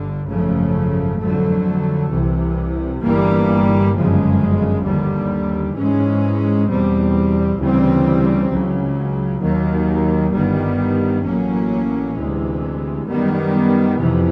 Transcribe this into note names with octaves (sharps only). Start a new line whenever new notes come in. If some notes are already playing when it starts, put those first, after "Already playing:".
Already playing: G1 G2 D3
G#1 F#2 C#3 F3 A3
F2 D3 F#3 A3
C2 C3 E3
G1 G2 E3 G3 A#3
G1 F#2 C#3 F3 G#3
D#2 D3 G3
G#2 E3 G#3 C#4
E2 B2 G3 C4
D2 C#3 E3 G3 C4
C#2 C#3 F#3
D#2 D#3 F#3 A#3
G1 G2 D#3 G3 B3
A1 A2 F#3 A#3 C#4
D2 C3 E3 G#3
F#2 D#3 G3 B3
F2 C3 E3